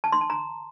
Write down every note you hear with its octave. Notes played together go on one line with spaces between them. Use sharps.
A5
C6
A5
A#5